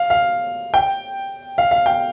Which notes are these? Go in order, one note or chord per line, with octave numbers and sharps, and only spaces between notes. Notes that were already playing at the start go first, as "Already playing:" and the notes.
Already playing: F5
F5
G5
F5
F5
G5